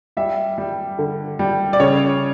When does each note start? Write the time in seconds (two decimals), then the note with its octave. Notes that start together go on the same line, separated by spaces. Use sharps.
0.17 G3 E5
0.58 G3
0.99 D3
1.39 G3
1.73 D5
1.80 C#3 C#5